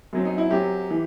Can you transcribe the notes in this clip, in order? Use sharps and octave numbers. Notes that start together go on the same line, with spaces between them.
F#2 F#3 C4
D#4
E4
F#2 F#3 C4 G4
E3